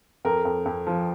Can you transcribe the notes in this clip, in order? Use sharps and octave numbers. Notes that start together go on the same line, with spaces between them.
F2 A#4
F2
F2
F3